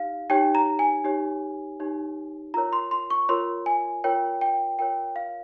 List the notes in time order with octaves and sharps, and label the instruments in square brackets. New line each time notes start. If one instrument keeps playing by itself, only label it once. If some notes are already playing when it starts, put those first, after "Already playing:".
Already playing: [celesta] D#4 G4 F5
D#4 G4 C#5 G5
A#5
G#5
D#4 G4 C#5
D#4 G4 C#5
F4 A#4 C#5 A#5
C6
C6
C#6
F4 A#4 C#5 C6
G#5
F4 A#4 C#5 G5
G5
F4 A#4 C#5 G5
F5